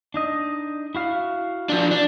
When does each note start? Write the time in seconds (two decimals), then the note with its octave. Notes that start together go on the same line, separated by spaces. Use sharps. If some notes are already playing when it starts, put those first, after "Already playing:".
0.14 D4 D#4 D#5
0.95 E4 F#4 F5
1.69 F3 D4
1.91 D4